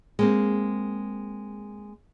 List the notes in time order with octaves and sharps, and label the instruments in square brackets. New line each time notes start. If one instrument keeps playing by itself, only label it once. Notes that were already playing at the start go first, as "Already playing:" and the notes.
[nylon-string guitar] G#3 A#3 C4